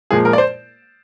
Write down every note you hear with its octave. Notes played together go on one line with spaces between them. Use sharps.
A#2 F3 G#3 G#4
A#4
D5
C5